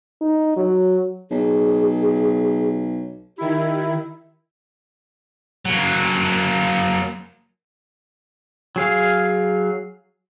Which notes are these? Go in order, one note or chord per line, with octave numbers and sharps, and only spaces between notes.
D#4
F#3
B1 G#4
D#3 E4 G4
F#3 A#3
F#3 G#4 F5